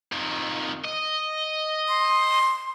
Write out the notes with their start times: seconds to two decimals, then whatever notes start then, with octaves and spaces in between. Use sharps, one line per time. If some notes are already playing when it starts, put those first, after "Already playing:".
0.12 F2 D#3
0.85 D#5
1.89 C6